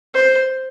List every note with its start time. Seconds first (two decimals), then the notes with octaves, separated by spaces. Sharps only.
0.14 C5